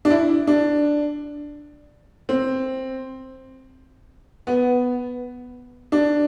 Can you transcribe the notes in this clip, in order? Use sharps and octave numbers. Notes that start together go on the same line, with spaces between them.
D4
E4
D4
C4
B3
D4